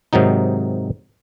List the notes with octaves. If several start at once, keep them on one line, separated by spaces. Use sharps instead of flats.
G#2 C3 D#3 F#3 D#4